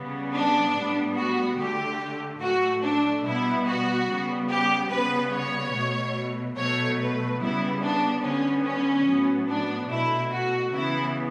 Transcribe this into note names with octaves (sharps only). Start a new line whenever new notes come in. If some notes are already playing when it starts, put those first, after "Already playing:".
Already playing: C#3 G3 B3
D4
A2 G3 B3
F#4
D3 A3 G4
A2 F#3 A3 F#4
D4
B2 G3 B3 E4
F#4
C#3 G3 B3
G4
C#3 G3 B3 B4
C#5
B2 A3
B2 F#3 A3 C#5
B4
C#3 G3 B3 E4
D4
D3 G3 B3 C#4
C#4
A2 F#3 B3
D4
B2 A3 E4
F#4
C#3 E3 B3 E4